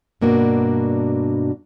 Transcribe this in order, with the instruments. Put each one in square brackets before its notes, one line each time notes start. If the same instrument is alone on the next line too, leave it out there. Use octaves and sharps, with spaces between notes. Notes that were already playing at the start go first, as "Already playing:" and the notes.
[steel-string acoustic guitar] G2 B2 A#3 D4 F#4